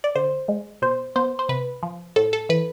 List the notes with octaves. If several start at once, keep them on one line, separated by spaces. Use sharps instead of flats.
D5
D3 C5
G#3
B2 C5
B3 C5
C5
C3 B4
F3
A2 A4
A4
E3 B4